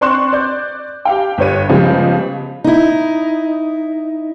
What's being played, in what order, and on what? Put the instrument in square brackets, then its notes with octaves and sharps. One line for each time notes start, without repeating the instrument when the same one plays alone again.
[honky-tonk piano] C4 D5 C6 C#6 F#6 E7
D5 G6
G4 F5 G5
G1 G4 B4 C#5 D#7
C#3 F3 G3 G#3 B3
[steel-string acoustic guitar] D#4 E4